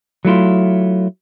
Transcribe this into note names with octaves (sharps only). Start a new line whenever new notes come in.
F#3 A3 E4 F4